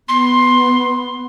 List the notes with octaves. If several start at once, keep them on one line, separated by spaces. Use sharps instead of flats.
B3 C6